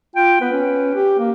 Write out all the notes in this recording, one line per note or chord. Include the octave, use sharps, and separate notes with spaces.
F4 G5
B3 B4
C#4
G4
A#3